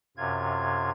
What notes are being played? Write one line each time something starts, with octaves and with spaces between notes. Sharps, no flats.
F#2 C3 F4 G#6